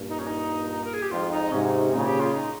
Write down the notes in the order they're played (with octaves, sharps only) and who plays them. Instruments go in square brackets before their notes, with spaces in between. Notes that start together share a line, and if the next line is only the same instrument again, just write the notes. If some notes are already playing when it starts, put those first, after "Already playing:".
Already playing: [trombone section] G2 A#2
[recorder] D#4
C#4
D#4
A#4
G#4
G4
[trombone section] F2 G#2 [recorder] F4
[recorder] D#4
[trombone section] G#2 C3 [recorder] C#4
[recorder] D#4
C#4
[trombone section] A#2 C#3 [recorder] D#4
[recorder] G4
F4
D#4